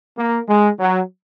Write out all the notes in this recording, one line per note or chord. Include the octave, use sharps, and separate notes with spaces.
A#3
G#3
F#3